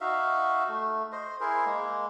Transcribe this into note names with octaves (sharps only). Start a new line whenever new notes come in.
D#4 F#4 E5 F5
A3
C5 D#5
E4 G#4 A#4 C5
G#3 A#3